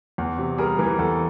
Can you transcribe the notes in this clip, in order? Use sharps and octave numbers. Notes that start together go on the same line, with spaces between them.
E2
C3
G3 G#4 A#4
E3
E2 A4